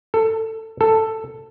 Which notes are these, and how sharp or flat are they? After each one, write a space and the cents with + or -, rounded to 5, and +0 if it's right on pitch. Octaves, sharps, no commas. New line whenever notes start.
A4 +20
A4 +10